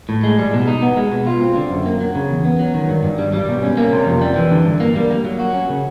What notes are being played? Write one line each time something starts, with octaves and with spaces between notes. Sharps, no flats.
A2
G#3
G3
B2
D#4
B3
G#3
B2
F4
C4
D3
F#2
A#3
F#3
C#3
E2
B3
F#3
D#3
G2
G2
G3
G3
B2
C#4
A#3
C3
F2
G3
E3
D3
G2
A#3
G3
A#3
F#3
F#4
C#4
C#3